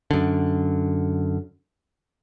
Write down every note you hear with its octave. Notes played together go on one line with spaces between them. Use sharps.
F#2 D3